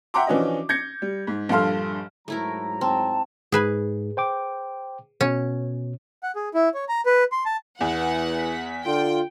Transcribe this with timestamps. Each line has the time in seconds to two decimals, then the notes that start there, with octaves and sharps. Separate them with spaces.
0.14 E5 F#5 G5 A#5 C6 D6
0.27 E3 F3 C#4 D4 F#4 D#5
0.69 G6 G#6 A#6 C#7
1.02 G3
1.27 G#2
1.49 A#1 G2 A4 F5 C6 F6
2.28 G#2 F#3 A3 E4 A#4 A#5
2.81 C4 A5
3.52 G#2 G#4 B4 G#5
4.17 C5 G5 D6
5.21 B2 C#4
6.23 F#5
6.36 G#4
6.54 E4
6.74 C#5
6.89 A#5
7.06 B4
7.32 C6
7.46 A5
7.81 E2 E3 F#5
8.38 B6
8.86 D3 F4 G5